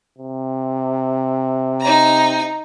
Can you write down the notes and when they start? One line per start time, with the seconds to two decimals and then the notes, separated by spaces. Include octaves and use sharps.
0.18 C3
1.81 D#4 A#5